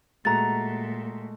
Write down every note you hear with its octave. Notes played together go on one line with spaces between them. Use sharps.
A#2 G#3 A3 F#4 A#5 A6